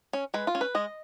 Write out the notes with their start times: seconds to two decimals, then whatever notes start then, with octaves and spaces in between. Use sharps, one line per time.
0.13 C#4
0.34 G#3 B4
0.47 F4
0.55 C#4
0.61 B4
0.75 G#3 D#5